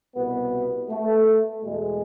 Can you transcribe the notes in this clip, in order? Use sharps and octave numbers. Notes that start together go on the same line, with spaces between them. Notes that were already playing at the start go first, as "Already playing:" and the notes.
C2 B2 B3
A3
E2 B2 G#3